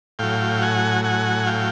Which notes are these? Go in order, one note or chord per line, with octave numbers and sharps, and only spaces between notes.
A2 F#3 F5 G5
F#5 G#5
F#5 G#5
F5 G5